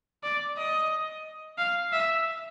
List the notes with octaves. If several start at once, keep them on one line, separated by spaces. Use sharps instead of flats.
D5
D#5
F5
E5